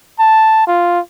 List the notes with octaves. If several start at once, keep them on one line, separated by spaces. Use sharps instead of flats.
A5
F4